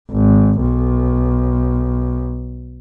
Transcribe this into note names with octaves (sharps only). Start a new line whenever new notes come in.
G#1
B1